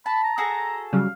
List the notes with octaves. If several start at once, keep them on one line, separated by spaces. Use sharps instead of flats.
A5 B5
A#5
F#4 G#4 A4 A#6
C#3 F#3 G3 F5